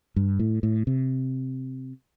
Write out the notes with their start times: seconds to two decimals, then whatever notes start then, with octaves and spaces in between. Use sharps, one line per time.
0.16 G2
0.39 A2
0.63 A2
0.87 C3